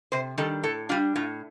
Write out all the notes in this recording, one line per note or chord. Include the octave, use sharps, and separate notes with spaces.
C3 C5
D#3 G3 D4 A4
A2 A4
G3 D4 F4
A2 F4